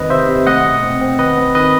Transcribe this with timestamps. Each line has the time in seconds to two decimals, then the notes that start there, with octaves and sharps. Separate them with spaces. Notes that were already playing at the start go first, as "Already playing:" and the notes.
Already playing: D#3 C4 B4 D#5
0.10 C3 C5 E5
0.28 C3
0.47 A3 D#5 F#5
0.65 B2
0.83 C4
1.01 C4
1.19 D#3 B4 D#5
1.37 C4
1.55 D#3 B4 D#5